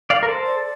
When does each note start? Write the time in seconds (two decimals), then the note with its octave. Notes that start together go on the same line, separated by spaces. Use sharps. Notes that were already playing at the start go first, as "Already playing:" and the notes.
0.10 D5 F5
0.23 A#4
0.28 A4 C5
0.46 D5